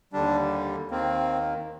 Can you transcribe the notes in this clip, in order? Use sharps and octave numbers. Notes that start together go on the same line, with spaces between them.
D#2 D3 G3 D4
D#2 D#3 A#3 C4